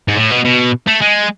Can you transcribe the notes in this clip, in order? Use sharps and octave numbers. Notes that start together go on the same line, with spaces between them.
G#2
A2
B2
B2
A3
G#3